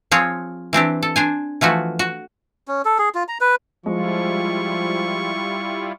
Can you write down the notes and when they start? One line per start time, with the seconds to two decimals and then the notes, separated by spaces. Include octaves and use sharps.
0.11 F3 C4 G#4 C#5
0.73 E3 C4 D4 G4
1.03 A4
1.16 D4 C5 G#5
1.61 E3 F3 A3 F#4
1.99 F#4
2.68 C#4
2.85 A4
2.98 G#4
3.15 F4
3.28 A#5
3.41 B4
3.86 F3 G3 G#3 E4 F4 C#6